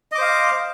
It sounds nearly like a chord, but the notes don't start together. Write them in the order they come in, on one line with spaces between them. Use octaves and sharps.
D#5 D6 C5 F5